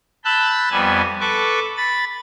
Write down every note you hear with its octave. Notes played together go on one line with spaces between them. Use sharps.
A5 B5 E6 F#6 G6
F2 G3 B3 G#5
A4 B4 C#6 D6
B5 A6